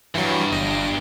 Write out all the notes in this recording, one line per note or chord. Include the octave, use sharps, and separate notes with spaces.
G2 E3 F#3
G1 D#5